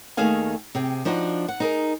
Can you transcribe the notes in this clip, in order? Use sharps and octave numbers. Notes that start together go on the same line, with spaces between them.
D#2 D#3 A3 G#4 F5 G#5
C3 G#4 G5
F3 D4 D#4 F4 F#4
F#5
D#4 G#4 A#4